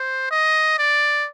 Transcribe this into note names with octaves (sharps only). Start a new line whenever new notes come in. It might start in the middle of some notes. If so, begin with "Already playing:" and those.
Already playing: C5
D#5
D5